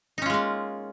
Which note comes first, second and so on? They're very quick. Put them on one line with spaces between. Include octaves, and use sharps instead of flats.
D#4 C#4 F4 G#3 A#3